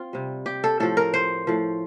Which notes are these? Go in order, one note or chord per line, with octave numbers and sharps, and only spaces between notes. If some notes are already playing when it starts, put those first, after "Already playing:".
Already playing: C4 F4
C3 G3
G4
A4
A2 F3 A4
A#4
C5
A2 F3